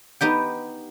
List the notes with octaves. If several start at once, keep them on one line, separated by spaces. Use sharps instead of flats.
B3 D#4 G4 G5